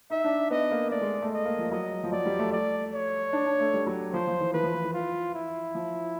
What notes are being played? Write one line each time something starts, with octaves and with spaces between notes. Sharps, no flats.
D#4 E5
D4
B3 D#5
A#3
A3 D5
G#3
A3
D#5
A#3
F3
F#3 D#5
F3
F#3 D5
G3
A3
D5
C#5
D4
D4
A3
G3
F#3
F3 C5
F3
E3
E3 B4
F3
F3
E3
F4
E4
F3